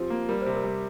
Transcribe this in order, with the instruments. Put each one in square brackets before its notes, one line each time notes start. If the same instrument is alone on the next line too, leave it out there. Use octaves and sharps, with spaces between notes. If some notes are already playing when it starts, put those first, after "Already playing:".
Already playing: [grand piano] F3 C4 [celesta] G4
[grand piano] A#3
[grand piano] G3 [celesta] A#4
[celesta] C5
[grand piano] C3
[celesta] A#4
[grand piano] G3